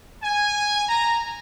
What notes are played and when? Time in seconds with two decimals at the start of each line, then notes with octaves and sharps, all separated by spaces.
0.22 G#5
0.89 A#5